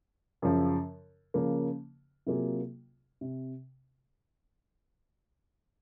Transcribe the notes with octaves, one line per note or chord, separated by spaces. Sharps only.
F#2 C#3 F3
C#3 F3 A#3
C3 F#3 A#3 F4 G#4
C3